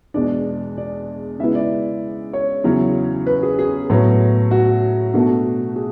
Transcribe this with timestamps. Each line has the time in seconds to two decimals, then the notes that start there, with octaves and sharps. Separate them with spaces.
0.14 E2 B2 G#3 D4 D5
0.78 D5
1.39 C#3 G#3 B3 E4 E5
1.55 D5
2.33 C#5
2.64 E2 C#3 F#3 C#4 E4
3.26 B4
3.43 G#4
3.59 G#4
3.90 A2 F#3 B3
4.51 F#4
5.13 B2 A3 D4 F#4
5.76 G#4